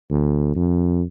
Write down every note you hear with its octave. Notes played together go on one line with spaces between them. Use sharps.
D2
F2